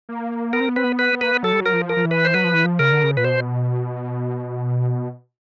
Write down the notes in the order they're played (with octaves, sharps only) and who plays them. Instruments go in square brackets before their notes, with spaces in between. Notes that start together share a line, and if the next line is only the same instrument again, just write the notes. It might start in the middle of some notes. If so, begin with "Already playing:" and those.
[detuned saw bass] A#3
[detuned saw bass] B3 [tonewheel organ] A#4
[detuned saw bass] C4
B3
[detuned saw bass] C4 [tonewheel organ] B4
[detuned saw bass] B3
[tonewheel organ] B4
[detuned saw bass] B3
[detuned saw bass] A#3 [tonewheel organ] B4
[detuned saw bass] B3
[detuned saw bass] F#3 [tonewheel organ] A4
[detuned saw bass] G3
[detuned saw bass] F#3 [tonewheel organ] A#4
[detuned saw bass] F3
[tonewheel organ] A#4
[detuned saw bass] F3
E3
[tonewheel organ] B4
C5
[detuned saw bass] F#3 [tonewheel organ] B4
[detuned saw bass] F3
E3
F3
[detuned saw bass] C#3 [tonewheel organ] A#4
[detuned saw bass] D3
C#3
[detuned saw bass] A#2 [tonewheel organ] B4
[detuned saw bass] B2 [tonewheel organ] C5